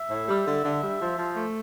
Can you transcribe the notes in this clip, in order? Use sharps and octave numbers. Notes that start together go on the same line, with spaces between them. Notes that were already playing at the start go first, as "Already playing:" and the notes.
Already playing: E5
A2
G3
D3
D3
G3
F3
F3
A3